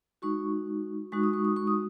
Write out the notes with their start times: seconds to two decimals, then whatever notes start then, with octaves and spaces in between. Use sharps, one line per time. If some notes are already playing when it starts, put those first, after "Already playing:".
0.22 G#3 D#4 F#4 C#6
1.12 G#3 D#4 F#4 C#6
1.23 D#6
1.33 C#6
1.45 D#6
1.56 C#6
1.67 D#6